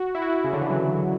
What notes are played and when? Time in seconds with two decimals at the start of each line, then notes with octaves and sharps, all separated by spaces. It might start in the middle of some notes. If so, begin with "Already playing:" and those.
Already playing: F#4
0.15 E4
0.22 F#4
0.30 E4
0.44 C#3
0.53 D3
0.61 E3
0.70 F#3